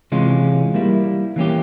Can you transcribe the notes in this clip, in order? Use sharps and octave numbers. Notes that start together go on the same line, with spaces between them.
C3 E3 G#3 C#4 F4
G3 A#3 E4
E3 A#3 C#4 G4